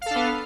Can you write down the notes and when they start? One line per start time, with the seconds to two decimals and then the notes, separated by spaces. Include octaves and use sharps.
0.01 F5
0.06 A4
0.11 D4
0.15 B3